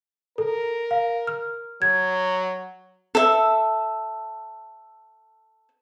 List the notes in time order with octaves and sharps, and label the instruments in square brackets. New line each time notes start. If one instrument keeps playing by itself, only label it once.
[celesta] A4 [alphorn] A#4
[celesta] F5
F6
[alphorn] F#3 [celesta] G#6
[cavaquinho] A4 E5